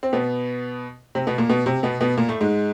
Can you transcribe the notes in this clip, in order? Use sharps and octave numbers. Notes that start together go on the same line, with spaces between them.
C4
B2 B3
C3 C4
B2 B3
A#2 A#3
B2 B3
C3 C4
B2 B3
B2 B3
A#2 A#3
A2 A3
G#2 G#3